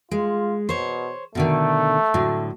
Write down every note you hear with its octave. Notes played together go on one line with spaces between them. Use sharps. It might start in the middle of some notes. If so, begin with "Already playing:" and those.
G#3 F4
B2 C5 C#5
B2 D3 D#3 A3
A2 D3 F#3